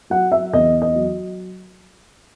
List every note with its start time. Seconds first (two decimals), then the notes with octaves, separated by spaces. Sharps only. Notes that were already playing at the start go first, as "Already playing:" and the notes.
0.10 F#3 F#5
0.32 E5
0.53 E2 D#5
0.82 D#5
0.95 F#3